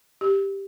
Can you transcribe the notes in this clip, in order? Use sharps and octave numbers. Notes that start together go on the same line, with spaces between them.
G4